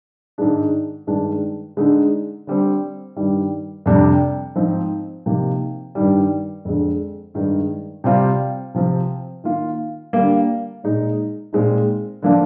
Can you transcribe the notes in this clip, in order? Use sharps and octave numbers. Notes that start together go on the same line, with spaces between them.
G#2 D#3 G#3 D4
G2 D#3 G#3 D4
D3 G#3 D#4
D3 G3 C4
G2 D#3 G3
F2 C3 G3 D4
G#2 F3 C4 D#4
C3 F3 A#3 D#4
G2 D#3 G3
F2 D3 G#3
G2 D#3 G#3 D#4
C3 G3 C4 F4
C3 F3 C4
D#3 A#3 F4
D3 G3 A#3
A#2 G#3 D#4
A#2 G#3 C4 D#4
D3 F3 A#3 D4 F4